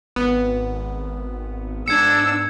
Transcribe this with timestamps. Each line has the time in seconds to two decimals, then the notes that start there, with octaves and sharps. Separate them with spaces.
0.16 G#1 B3
1.88 G#2 D4 E6 G#6 C#7